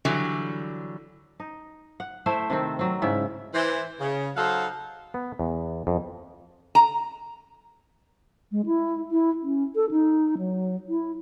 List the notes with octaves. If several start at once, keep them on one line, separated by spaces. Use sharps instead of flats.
D3 E3 F#3 G3
D#4
F#5
A3 E4 C5 E5
C3 D#3 C4
F#3 C4
G#2 C#3 E4
E3 C5
C#3
F#3 D#4 A4 C5 F5 F#5
B3
E2
F2
A#5
G#3
E4
E4
C#4
A4
D#4
F#3
E4